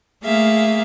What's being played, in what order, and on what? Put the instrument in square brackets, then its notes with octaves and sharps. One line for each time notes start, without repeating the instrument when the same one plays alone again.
[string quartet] A3 A#3 G#4 E5 F5